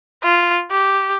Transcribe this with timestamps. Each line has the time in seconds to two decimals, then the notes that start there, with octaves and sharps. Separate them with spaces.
0.23 F4
0.71 G4